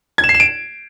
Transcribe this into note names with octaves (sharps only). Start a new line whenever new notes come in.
G#6
E7
C7
E7
D7